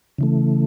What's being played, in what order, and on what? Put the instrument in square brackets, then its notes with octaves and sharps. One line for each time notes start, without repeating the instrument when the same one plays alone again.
[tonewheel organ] C#3 E3 A3